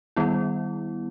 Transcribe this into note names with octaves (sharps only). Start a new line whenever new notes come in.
D#3 G3 B3 E4